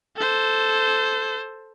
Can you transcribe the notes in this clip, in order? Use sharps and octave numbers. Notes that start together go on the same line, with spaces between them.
A4 C5